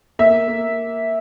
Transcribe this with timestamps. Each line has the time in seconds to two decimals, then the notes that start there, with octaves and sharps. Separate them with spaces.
0.19 A#3 E5
0.48 A#3